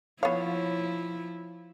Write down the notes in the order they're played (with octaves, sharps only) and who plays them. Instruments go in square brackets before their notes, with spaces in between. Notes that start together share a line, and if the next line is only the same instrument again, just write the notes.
[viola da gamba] F3 E4 [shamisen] B3 F5 [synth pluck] C#5